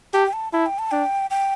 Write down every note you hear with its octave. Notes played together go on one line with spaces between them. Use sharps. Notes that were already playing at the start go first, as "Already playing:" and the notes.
G4 A5
G5
A5
E4 A5
G5
A5
D4 G5
G5